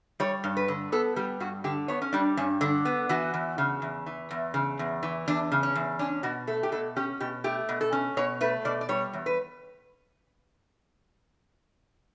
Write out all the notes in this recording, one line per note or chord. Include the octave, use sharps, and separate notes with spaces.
G3 C#5
G2
B4
D3
B3 A4
G3 G4
G2 F#4
D3 G4
B3 C#5
C#4
G3 D4
G2 C#4
D3 D4
B3
E3 F#4
E2
C#3
E2
E3
E2
C#3
E2
E3
E2 D4
C#3
C#4
E2
C#4 D4
B2 F#4
A3 A4
G4
B2 A4
C#4 G4
B2 G4
A3 G4
B2
A4
C#4
B2 C#5
A3 B4
B2 D5
D5
G3 C#5
E2
B4